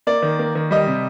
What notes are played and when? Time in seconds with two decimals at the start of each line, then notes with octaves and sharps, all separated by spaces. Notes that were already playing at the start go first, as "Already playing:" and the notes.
0.07 A#3 D5
0.22 D#3
0.39 A#3
0.55 D#3
0.71 G3 D#5
0.87 C3